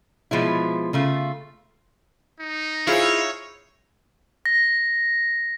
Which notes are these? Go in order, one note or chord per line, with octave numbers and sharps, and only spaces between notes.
B2 F3 G#3 E4
C#3 A3 F4
D#4
E4 F4 G#4 C5 C#5
A#6